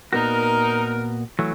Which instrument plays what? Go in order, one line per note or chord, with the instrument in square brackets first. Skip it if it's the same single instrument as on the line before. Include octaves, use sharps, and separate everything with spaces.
[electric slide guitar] A#2 B3 F#4 [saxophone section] D#4 A#4
[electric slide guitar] E3 F#3 A3